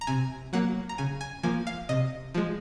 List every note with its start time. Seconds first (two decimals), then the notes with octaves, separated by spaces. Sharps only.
0.01 A#5
0.07 C3 G#5
0.53 F#3 A#3 F#5
0.89 A#5
0.98 C#3 G#5
1.21 G#5
1.43 F3 A#3 G#5
1.67 F5
1.89 C3 D#5
2.34 F3 G#3